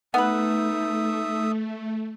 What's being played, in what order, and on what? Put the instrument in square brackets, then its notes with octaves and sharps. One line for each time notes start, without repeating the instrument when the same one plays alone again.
[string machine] A3 [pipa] B3 B4 [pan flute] D#4 [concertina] E5 D#6